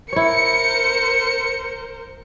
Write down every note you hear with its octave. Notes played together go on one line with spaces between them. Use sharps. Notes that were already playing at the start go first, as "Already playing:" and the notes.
E4 A#4 C5 C#5 C#7